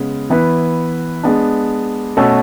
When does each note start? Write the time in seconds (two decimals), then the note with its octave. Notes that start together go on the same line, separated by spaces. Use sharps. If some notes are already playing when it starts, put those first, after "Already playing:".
Already playing: C#3 G#3 B3
0.30 E3 B3 E4 B4
1.23 G#3 B3 D4
2.17 B2 A3 C#4 F#4 A4